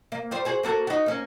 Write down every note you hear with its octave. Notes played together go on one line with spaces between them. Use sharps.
A#3
G3 G4 C5
F#4 G#4 C5
A#3 F#4 A4
D#4 F#4
A#3 C#4